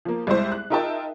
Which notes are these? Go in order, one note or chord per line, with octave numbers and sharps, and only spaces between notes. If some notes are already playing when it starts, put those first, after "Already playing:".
F3 A#3
C2 G3 G#3 E4 C5
F#6
D#4 F4 A#4 E5 G5 A5